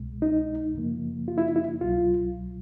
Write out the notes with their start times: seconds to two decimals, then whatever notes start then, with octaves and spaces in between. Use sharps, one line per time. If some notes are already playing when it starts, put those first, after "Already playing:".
Already playing: C2 B2 G#3
0.22 D#4
0.74 F#2 C#3 F3 A#3
1.28 F4
1.38 E4
1.48 D#4
1.56 E4
1.81 C2 B2 F#3 F4